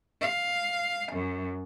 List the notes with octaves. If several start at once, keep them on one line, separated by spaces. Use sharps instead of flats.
F5
F#2